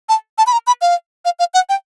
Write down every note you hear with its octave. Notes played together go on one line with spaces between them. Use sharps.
A5
A5
B5
A#5
B5
F5
F5
F5
F#5
G5